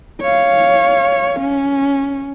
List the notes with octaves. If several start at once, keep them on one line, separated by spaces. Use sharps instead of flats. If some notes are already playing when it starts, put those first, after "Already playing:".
C#5 F5
C#4